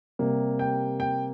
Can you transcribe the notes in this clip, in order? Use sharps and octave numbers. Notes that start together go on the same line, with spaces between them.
C3 G3 A#3
G5
G5